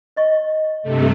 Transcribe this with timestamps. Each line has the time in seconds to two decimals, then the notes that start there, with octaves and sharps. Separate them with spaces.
0.16 C#5 D#5 C#6
0.83 G2 C3 A3